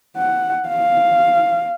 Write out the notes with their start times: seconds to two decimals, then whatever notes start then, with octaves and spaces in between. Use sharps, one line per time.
0.17 F#5
0.69 F5